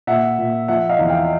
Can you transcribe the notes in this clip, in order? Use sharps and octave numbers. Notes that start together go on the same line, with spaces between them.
A#2 E5 F#5
A#2
F3 E5 F#5
D#5 F5
E2
F5 G5